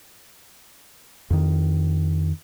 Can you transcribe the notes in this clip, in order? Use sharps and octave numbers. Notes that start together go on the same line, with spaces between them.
F2 D#3